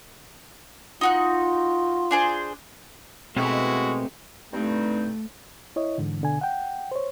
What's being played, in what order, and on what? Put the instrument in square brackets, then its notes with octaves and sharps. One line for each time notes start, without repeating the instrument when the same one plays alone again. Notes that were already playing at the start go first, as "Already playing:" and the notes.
[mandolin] D#4 F#4 F#6 [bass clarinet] F4
[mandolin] D4 G#4 C5
[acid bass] B2 [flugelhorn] G#3 [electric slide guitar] A3 C4 G4 [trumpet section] E4 F#4
[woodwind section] G2 C4 D#4 [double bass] A3
[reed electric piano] E4 C#5 D#5
G#2 D3 E3
B2 D3 G#5
F#5 G5
C5 C#5